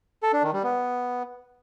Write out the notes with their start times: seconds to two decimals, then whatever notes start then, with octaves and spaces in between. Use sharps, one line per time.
0.23 A4
0.33 D4
0.43 D#3
0.53 G3
0.64 B3